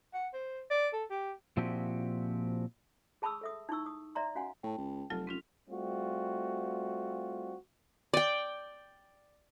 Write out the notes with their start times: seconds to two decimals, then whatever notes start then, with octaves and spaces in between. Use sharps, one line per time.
0.14 F#5
0.33 C5
0.70 D5
0.93 A4
1.10 G4
1.57 A#2 F3 C4 E4 F#4 G4
3.22 G#4 A5 B5 C#6 D#6 E6
3.41 A4 E5 D#6
3.69 D#4 E4 C#6 E6
3.86 D#6
4.15 D5 E5 A#5 C6
4.35 C#4 F#4 F5 F#5 G#5 C6
4.63 A2 G5 A5
4.78 C#2
5.10 F1 F#3 F4 A4 A5
5.27 C4 C#4 F4 B6 F7
5.70 G3 A3 C4 F4 F#4
8.14 D5 G5